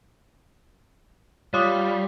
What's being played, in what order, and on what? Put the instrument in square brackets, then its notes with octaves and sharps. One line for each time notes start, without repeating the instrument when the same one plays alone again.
[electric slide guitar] G3 [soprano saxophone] F4 [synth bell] C#5 D6 D#6